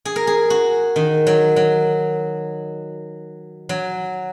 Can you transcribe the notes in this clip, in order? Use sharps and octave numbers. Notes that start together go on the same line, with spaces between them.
G#4
A#4
G#4
F#4
D#3
F#3
F#3
F#3